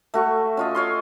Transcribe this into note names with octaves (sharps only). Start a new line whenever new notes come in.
A3 F#4 C#6
C#4 F4 D#5
C#5 F5 C6